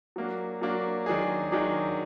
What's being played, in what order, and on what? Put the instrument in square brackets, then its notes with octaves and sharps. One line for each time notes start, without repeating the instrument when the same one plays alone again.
[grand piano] F#3 A#3 D4 F#4
F#3 A#3 D4 F#4
D#3 F#3 D4 G#4
D#3 F#3 D4 G#4